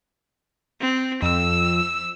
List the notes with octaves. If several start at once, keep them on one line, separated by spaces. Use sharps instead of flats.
C4
F2 E6